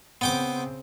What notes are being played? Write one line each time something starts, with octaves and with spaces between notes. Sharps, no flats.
C#3 B3 C4 G5 D6